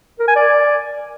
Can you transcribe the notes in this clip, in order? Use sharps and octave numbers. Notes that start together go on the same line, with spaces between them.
A#4
G#5
D5